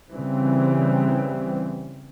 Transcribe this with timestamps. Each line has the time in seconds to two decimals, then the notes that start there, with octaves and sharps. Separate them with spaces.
0.11 C#3 E3 G3 C4